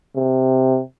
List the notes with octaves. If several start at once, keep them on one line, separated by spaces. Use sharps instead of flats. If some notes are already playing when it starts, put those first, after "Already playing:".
C3